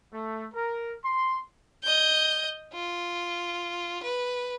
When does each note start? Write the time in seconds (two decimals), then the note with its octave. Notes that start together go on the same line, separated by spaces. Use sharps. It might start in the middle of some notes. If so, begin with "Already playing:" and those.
0.12 A3
0.54 A#4
1.03 C6
1.84 D#5 G6
2.73 F4
4.03 B4